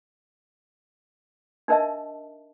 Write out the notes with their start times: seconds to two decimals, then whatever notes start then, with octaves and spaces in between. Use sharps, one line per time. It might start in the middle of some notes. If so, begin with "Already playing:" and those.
1.68 D4 D#4 A#4 D#5 E5 A5